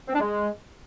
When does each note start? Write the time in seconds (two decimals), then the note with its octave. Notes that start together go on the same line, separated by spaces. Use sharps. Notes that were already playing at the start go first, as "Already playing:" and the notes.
0.08 C4
0.14 D4
0.20 G#3